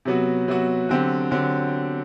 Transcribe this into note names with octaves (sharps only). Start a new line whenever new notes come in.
C3 F#3 B3 F#4
C3 F#3 B3 F#4
D3 F#3 C4 G4
D3 F#3 C4 G4